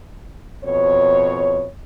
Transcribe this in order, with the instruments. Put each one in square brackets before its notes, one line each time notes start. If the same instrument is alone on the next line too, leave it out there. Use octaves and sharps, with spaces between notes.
[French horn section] F2 B2 C#5